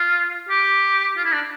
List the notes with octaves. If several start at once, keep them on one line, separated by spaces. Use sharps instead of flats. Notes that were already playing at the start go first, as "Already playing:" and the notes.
Already playing: F4
G4
F4
E4
D4